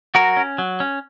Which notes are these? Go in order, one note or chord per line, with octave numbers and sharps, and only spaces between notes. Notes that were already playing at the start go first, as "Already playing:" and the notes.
F#3 F#4 A#4
C#4
F#3
C#4